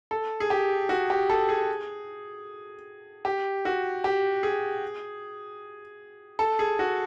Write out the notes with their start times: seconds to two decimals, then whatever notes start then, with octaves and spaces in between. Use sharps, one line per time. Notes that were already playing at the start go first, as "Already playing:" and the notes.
0.11 A4
0.40 G#4
0.50 G4
0.89 F#4
1.10 G4
1.30 A4
1.49 G#4
3.25 G4
3.65 F#4
4.04 G4
4.43 G#4
6.39 A4
6.59 G#4
6.79 F#4